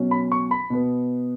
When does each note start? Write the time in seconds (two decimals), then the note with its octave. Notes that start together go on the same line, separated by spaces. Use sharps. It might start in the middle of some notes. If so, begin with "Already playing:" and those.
Already playing: B2 F#3 C#4
0.11 B5
0.32 C#6
0.51 B5
0.70 B2 B3